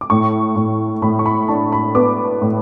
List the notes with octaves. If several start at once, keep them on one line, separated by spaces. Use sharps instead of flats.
D6
A2 C#6
A2
A2 B5
C#6
B5
D4 A5
B5
B3 D6
A2